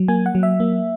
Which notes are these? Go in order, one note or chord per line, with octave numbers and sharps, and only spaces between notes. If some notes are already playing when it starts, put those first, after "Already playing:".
Already playing: F#3
A#3 G#5
F#5
F#3
E5
A#3